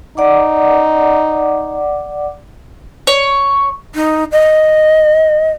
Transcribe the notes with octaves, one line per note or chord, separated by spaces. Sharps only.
D#4 D5 F#5 D6
C#5
D#4
D#5